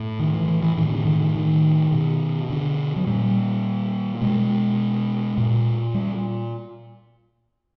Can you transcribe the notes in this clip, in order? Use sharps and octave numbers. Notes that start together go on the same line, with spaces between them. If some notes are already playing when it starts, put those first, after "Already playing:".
Already playing: A2
D#3
E3
E3
E3
A2 D#3
D3
D#3
D#3
D#3
B2
D3
F#3
A#2 G3
B2 G#3
A#2
G3